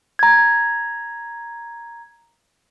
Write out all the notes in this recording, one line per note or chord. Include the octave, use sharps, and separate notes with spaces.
A#5 G#6